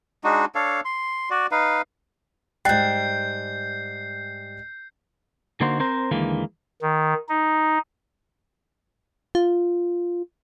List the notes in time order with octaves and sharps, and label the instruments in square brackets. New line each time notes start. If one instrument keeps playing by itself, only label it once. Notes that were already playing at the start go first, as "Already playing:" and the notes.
[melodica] G#3 D4 D#4 F#4
D4 A4 C#5 F5
C6
F#4 D5
D#4 B4 F5
[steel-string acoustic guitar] G#2 G3 [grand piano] G5 F#6 A6 [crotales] G6 C7
[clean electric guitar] D3 A#3 D#4 F#4 C5
C4 A#4 C5
D#2 D3 E3 G#3 A#3
[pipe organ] D#3
D#4
[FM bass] F4